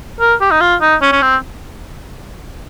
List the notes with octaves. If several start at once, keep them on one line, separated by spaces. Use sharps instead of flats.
A#4
G4
D#4
F4
D#4
C#4
C#4
C4